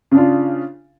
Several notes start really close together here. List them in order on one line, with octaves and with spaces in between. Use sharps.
C#3 D4 F4